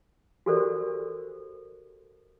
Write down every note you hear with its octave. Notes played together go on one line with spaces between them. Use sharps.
F#4 G4 A4 A#4 C5 D5